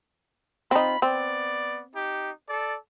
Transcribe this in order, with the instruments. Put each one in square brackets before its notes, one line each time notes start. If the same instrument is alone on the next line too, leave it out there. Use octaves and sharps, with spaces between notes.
[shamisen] C4 D#4 [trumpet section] F4 B5
[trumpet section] B3 D5 [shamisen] C4
[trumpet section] D#4 G4
A4 D5